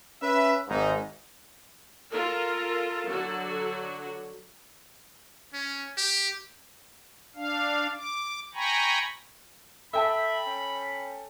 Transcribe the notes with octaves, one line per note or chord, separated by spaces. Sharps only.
C#4 B4 E5
G#1 G#2 D#4
F4 A4 A#4
D3 F#3 F#4
C#4
G4
D4 F5
D6
G5 G#5 A#5 B5 C#6
A4 E5 G5 A5 B5
C#4